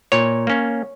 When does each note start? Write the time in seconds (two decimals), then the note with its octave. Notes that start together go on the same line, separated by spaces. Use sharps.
0.12 A#2 C#5
0.47 A#3 C#4